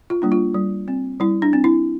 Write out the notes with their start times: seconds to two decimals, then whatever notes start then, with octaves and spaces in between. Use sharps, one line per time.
0.10 F4
0.22 G3 A#3 D4
0.32 F4
0.54 G3
0.88 C4
1.20 G3 E4
1.42 D4
1.53 C4
1.64 E4